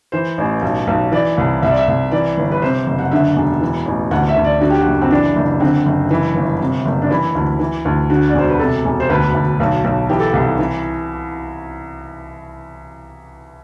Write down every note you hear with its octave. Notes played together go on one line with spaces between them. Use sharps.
E3 C5
A1
B1
B1
E3 D5
C2
C2 E5
D5
E5
C2
E3 D5
G1
B4
C3 C5
F#1
F#5
D3 E5
E1
E3
A1
D2 F#5
E5
D2
D5
D3 F#4
G4
F#4
F#1
C4
E3 D4
F#1
D3 C4
F#1
E3
G1
C3
F#1
D4
E3 E4
D2
E3
D2
D3 F#4
D5
E1 C5
B4
C3 A4
E1
C5
D2 B4
D2
B1
B1
E3 G4
A4
C2 G4
E3